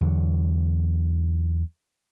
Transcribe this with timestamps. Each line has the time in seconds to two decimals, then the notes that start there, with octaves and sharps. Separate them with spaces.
0.01 E2 D3 F#3